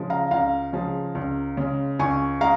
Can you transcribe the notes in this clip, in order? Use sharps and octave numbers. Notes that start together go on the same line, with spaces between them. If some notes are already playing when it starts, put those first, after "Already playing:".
Already playing: C#3 F3 G#3
F5 A#5
C#2 F5 A#5
C#3 F3 G#3
C#2
C#3 G#3
C#2 G#5 C#6
G#3 F5 A#5